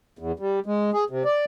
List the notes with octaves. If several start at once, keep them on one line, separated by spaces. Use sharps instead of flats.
E2
G3
G#3
G#4
C3
D5